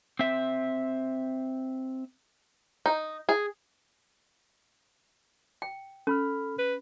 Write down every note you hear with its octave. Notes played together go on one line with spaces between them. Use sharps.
C4 E5
D#4
G#4
G5
C#4 A4 B5 F6
B4